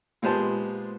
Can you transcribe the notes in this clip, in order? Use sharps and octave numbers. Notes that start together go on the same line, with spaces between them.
A#2 G#3 B3 G4 C5 A5